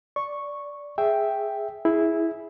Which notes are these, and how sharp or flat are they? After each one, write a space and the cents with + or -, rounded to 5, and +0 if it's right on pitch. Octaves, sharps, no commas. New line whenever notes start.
D5 -10 C#6 -5
G#4 +0 E5 +0 G5 +0
E4 -5 G#4 +0